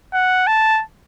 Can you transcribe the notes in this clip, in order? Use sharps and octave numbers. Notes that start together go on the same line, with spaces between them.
F#5
A5